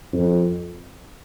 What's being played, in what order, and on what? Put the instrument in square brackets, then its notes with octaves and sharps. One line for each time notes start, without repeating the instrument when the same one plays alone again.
[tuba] F2